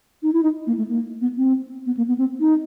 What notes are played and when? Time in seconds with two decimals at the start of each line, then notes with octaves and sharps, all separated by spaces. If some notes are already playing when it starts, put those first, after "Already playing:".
0.23 D#4
0.33 E4
0.43 D#4
0.67 A#3
0.77 A3
0.89 A#3
1.21 B3
1.37 C4
1.86 B3
1.97 A#3
2.08 B3
2.18 C4
2.40 D#4